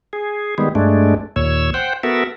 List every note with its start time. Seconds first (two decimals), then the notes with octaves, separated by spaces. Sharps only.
0.13 G#4
0.58 D#3 G3 G#3 B3
0.75 G2 G#3 A3 D4
1.36 D#2 A#2 C#5 E6
1.74 C5 F#5 G5
2.03 B3 F#4 A4 A#4 E5